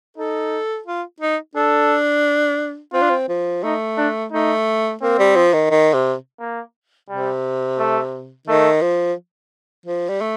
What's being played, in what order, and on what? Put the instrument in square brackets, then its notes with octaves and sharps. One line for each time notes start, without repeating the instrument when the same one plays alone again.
[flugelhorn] D#4 [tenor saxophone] A4
[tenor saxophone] F4
D#4
[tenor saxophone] D4 [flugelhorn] A4
[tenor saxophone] C4 [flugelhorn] F4
[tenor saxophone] D4
C4
F3
[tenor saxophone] A3 [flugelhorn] D#4
[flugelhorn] D4
[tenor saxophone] A3 [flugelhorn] D#4
[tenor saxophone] A#3 [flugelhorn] C4
[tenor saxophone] G3
F3
D#3
D#3
C3
[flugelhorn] A#3
[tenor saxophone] C3 [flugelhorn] G3
[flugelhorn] A3
[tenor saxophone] D#3 [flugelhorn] A3
[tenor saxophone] F3
F3
G3
A3